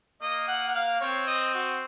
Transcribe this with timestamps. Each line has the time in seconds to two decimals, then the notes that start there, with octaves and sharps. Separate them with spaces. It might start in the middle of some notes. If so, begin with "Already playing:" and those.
0.22 A#3 D#5
0.48 F#5
0.68 F#5
0.75 F5
1.01 C4 C#5
1.27 D#5
1.54 F#4